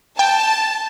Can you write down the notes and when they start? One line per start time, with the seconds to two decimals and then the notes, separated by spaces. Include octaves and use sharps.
0.19 G5 A5